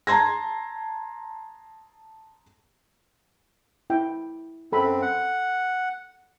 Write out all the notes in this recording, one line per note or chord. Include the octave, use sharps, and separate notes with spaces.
A5 A#5 C6 G#6 A#6
E4 G5
F#2 C4 A4 B5
F#5